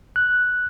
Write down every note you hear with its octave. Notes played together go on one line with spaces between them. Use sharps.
F#6